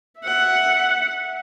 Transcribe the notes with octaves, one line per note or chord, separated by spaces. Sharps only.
E5 F#5